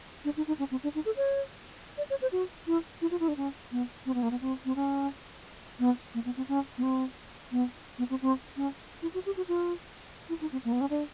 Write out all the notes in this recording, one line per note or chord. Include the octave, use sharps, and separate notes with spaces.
D4
D#4
D#4
C#4
C4
D4
D#4
A4
C#5
D5
C#5
C5
F#4
E4
E4
F4
E4
D4
C#4
B3
C4
B3
A#3
B3
C4
C4
C#4
B3
A#3
B3
C4
C#4
B3
C4
B3
B3
C4
C4
C#4
E4
F#4
G4
F#4
F4
E4
D#4
C4
A#3
B3
C#4
D4